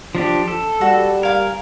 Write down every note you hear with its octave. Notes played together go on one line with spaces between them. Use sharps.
F3 D4 G4
A4
G3 F#4
A#4 F5 G#5